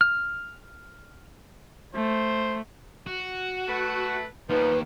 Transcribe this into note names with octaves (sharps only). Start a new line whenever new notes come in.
F6
A3 C5
F#4
A3 B4
D#2 D#3 F3 G3 B3 B4